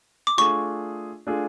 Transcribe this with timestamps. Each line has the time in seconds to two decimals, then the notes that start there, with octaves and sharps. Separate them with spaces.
0.27 D6
0.38 A3 D4 F4 G#4 C#6
1.27 A3 D4 F4 G#4